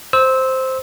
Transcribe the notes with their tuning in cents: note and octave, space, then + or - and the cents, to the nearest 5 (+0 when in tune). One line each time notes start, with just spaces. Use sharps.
C5 +0 E6 -20